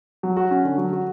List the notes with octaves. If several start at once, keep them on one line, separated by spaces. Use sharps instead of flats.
F#3
F#4
C#4
D3
F#3
F#4